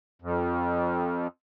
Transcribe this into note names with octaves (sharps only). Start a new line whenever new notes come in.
F2